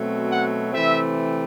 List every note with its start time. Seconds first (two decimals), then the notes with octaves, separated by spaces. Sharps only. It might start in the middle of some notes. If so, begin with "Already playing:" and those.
Already playing: B2 F#3 A3 C4
0.31 F#5
0.73 C3 E3 A3 C4 E5